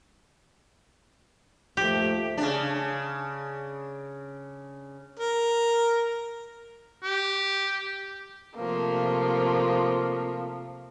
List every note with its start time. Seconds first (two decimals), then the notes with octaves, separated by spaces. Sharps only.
1.77 D#2 F3 A3 G4
2.37 C#3 D4
5.20 A#4
7.03 G4
8.57 C3 F3 A3 A#3